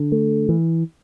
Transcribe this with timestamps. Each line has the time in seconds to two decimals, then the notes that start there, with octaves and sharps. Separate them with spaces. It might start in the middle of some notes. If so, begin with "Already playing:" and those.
Already playing: D3
0.12 A3
0.49 E3